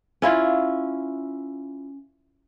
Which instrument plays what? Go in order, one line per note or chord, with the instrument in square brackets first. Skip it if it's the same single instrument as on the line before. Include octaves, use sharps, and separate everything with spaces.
[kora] C#4 E4 F4